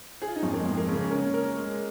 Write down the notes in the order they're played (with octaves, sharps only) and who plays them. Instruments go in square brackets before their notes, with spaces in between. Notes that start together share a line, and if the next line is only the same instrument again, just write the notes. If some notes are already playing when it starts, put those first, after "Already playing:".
[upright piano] G#4
F4
D#4
[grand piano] F2 [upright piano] C#4
[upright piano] A#3
G#3
[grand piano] F2
[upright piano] A#3
[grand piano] C#3 [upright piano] C#4
[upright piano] A#3
G#3
[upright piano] A#3 [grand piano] C#4
[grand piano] A#4
G#3